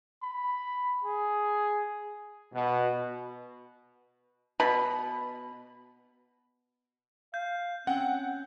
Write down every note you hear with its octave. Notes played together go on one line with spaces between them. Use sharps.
B5
G#4
B2
B2 B5
F5 G6
C4 C#4 F#5 G5